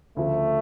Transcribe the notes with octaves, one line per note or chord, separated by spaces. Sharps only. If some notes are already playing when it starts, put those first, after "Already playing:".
D2 C#3 F3 A3